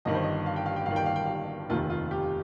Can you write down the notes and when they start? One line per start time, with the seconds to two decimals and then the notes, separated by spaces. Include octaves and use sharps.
0.05 G1 G2 D#3 D#5
0.15 C5
0.24 D#5
0.46 F5
0.56 G5
0.66 F5
0.76 G5
0.86 G1 G2 D#3 F5
0.96 G5
1.06 F5
1.16 G5
1.26 F5
1.69 F1 D#2 D#3 F4
1.90 F4
2.11 G4